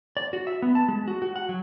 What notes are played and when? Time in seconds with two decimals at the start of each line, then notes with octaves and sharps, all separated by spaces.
0.17 D5
0.33 F#4
0.47 E5
0.62 B3
0.75 A5
0.88 G#3
1.08 F#4
1.22 F#4
1.36 F#5
1.49 F#3